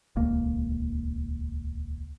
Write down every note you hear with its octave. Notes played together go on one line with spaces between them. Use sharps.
D#1 C#2 A#3